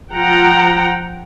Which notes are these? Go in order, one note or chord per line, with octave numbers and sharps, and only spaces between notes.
F3 F4 F#5 G5 A#5